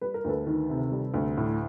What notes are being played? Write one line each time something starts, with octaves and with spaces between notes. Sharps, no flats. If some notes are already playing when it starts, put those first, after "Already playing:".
G3 B4
A#4
D2 A4 B4
D#3
C3
G3
D2
A2